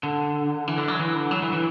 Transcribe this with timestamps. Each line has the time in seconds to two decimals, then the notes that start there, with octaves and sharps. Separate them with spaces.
0.03 D3
0.68 E3
0.78 D3
0.88 F#3
1.00 E3
1.15 D3
1.31 F#3
1.42 E3
1.53 E3